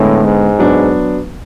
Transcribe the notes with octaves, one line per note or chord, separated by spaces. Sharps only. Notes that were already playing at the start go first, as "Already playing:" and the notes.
Already playing: A2 D3 G#3 B3
G#2
F#3 B3 D4